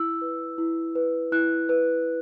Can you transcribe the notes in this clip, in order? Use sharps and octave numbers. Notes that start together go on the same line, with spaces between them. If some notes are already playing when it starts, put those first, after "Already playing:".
Already playing: E4 E6
B4
E4
B4
E4 F#6
B4